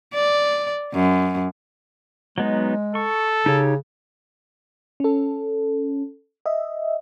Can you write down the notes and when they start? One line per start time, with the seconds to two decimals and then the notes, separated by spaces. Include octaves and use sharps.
0.14 D5
0.94 F#2
2.38 F#3 G#3 B3 D#4
2.95 A4 C#6
3.46 C#3 D#4 G4 C#5
5.00 C#4 A4
6.46 D#5 E5